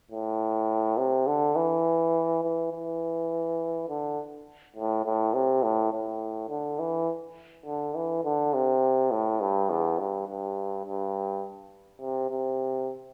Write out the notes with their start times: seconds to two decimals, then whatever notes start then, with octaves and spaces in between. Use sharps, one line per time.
0.11 A2
0.98 C3
1.27 D3
1.56 E3
2.44 E3
2.72 E3
3.89 D3
4.76 A2
5.05 A2
5.34 C3
5.63 A2
5.93 A2
6.49 D3
6.79 E3
7.66 D3
7.95 E3
8.24 D3
8.54 C3
9.11 A2
9.41 G2
9.70 E2
9.99 G2
10.27 G2
10.86 G2
12.01 C3
12.31 C3